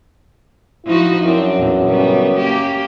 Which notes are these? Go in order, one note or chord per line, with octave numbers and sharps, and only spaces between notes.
F3 D#4 E4 F#4
F#2 C4 D4
E2 A#2
C#3 G3 B3
A#3 C#4 G4